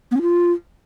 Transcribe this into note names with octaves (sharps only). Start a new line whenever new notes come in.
B3
C#4
F4